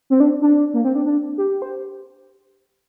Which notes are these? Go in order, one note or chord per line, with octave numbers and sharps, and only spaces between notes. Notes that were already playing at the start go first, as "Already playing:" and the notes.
C4
D4
D4
A#3
C4
D4
D4
G4
C5